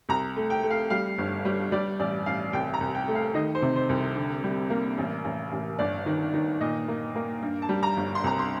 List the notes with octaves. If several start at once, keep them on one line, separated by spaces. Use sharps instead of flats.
C2 A#5
A3
G5
A3
F5
G3 F5
G1
G3
G3 D5
A1 D5
A1 F5
C2 G5
A#5
C2
G5
A3
F5
D#3 D#5
C5
C3
C5
C2
D3
G3
A#3
A1
A1
A1
G1 D5
D#3
D#3
A#2 D#5
A#3
A#3
G2
A5
G3
A#5
G1
C6
C2 A#5
C6